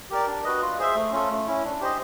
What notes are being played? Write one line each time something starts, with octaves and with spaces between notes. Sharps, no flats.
G4 A#4 D5
D4
F#4 B4 D#5
F4
G#4 C5 E5
A3
C#4 F4 A4
A3
C#4 E4
D4
G4 C5 D#5